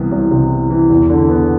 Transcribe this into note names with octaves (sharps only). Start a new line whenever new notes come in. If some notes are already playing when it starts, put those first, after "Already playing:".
Already playing: C2 C3 E3 B3
C2
C3
B3
E3
E2
D3
B3